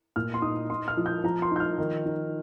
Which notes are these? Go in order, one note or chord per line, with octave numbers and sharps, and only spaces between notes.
A#2 F6
C6
D#4 D#6
D#4 C6
F6
F3
G6
F3 A#5
C6
D#4 G6
F6
D#3
D#4